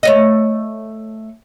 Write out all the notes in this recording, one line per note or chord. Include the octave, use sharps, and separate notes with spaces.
A3 C#5 D#5